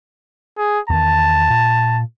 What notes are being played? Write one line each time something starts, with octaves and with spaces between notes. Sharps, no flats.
G#4
E2 D#3 A5
A#2